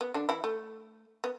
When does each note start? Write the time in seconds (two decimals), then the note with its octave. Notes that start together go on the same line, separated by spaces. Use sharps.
0.01 B3
0.14 D3 D4
0.29 E3 E4
0.44 A3
1.24 B3